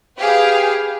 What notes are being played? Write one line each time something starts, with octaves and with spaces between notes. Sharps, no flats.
G4 G#4 B4 F5